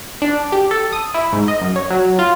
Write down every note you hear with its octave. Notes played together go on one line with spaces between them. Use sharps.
D4
G4
A4
D#6
E4
G#2
D#5
F#2
C#5
F#3
F4